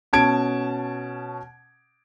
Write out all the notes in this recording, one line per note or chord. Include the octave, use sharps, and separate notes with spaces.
B2 C#4 A5 G#6 D7